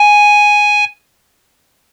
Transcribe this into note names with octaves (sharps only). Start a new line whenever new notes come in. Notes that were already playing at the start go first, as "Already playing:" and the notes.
Already playing: G#5